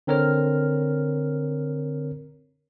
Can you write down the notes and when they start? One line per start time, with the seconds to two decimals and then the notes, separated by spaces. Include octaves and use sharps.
0.07 D3 C4 A#4 C#5 F6